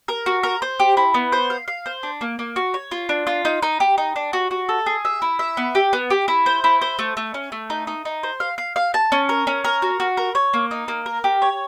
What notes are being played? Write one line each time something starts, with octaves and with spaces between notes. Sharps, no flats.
A#4
F#4
A#4
C5
G4
E4
B3
C5
F5
F5
C5
D4
A#3
A#3
F#4
C#5
F4
D4
F4
D#4
D#4
G4
D#4
D4
F#4
F#4
A4
G#4
E5
E4
E5
B3
G4
B3
G4
E4
C5
E4
C5
A3
A3
C#4
A3
D#4
D#4
D#4
C5
F5
F5
F5
A5
C#4
A#4
C#4
A#4
F#4
F#4
A#4
C#5
A#3
D#4
A#3
A#4
G4
C#5